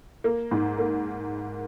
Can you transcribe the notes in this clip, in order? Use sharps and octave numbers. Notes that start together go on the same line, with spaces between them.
A#3
G#2
A#3